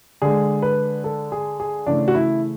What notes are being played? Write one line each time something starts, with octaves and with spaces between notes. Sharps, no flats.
D3 G#3 G#4
B4
A4
G#4
G#4
C#3 E3 A3 D4
F#4
E4